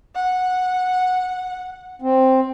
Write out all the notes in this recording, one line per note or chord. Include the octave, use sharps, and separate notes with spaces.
F#5
C4